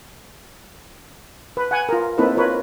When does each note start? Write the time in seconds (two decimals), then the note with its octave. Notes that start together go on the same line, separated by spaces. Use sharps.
1.57 B4
1.71 F#5 G#5
1.89 F4 A#4
2.18 A#3 C4 D#4 E4 A4 B4
2.37 F4 A#4 B4 C#5